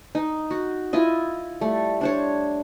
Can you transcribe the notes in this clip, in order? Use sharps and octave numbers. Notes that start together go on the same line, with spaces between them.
D#4
F#4
E4 F4 D#5
G3 A3
D4 C5 C#5